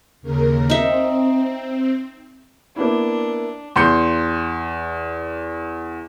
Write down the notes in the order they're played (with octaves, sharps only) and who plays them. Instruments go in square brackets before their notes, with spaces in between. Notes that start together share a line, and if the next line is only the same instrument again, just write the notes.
[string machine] D#2 C#3 A#4
[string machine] C4 [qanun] D#4 E5
[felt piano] A#3 B3 E4 [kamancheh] D4
[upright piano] E2 C6 G6 C#7